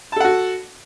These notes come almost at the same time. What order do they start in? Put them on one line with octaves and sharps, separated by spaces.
A5 A4 F#5 F#4